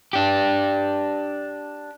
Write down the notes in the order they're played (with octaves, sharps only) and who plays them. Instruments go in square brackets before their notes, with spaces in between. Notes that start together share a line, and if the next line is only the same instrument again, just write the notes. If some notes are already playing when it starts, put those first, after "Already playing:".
[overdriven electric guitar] D4 G4